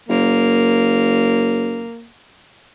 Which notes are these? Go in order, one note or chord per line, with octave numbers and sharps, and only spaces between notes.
F#1 A#3